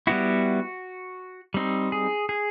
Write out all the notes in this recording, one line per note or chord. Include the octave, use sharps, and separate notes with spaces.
G3 B3 E4 F#4
G3 C4 D#4
G#4
G#4